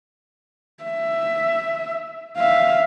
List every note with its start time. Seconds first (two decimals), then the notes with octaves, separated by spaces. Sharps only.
0.84 E5
2.37 E5 F5